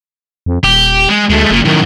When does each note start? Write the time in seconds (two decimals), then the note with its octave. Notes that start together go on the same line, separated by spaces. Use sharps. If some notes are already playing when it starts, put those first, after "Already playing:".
0.46 F2
0.64 D#1 G4
1.09 G#3
1.30 D2 G#3 A3
1.51 F#1 A#2
1.65 F#2 A2 D#3